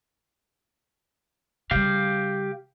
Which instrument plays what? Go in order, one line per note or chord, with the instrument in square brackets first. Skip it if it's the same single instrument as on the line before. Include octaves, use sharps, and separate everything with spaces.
[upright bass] C#3 G3 [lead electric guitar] G4 F5